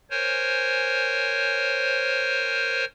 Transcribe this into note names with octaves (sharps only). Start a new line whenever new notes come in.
A#4 C5 C#5 G#5